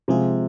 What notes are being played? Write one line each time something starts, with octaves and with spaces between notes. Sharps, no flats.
C3 F3 G#3 F4 G#4